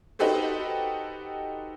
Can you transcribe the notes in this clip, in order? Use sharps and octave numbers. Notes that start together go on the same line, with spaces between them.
D#4 F#4 G4 A4 B4 C5